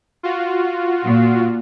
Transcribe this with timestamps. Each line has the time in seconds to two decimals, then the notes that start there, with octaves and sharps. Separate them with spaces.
0.23 F4 F#4
1.04 A#2